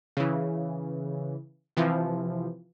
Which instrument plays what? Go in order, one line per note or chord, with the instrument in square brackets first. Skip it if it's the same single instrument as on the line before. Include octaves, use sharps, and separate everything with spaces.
[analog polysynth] C#3 E3
C3 E3 F3